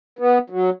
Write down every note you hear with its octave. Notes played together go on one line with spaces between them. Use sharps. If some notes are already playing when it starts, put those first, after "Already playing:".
B3
F#3